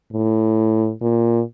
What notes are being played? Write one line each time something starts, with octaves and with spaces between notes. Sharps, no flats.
A2
A#2